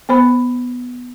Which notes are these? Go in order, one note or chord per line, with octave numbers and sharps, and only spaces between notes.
B3 C5 B5